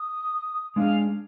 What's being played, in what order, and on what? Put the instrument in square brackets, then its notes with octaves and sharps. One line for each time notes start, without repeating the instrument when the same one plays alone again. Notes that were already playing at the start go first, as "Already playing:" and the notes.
Already playing: [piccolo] D#6
[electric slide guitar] G#3 D4 G#4 [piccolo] F5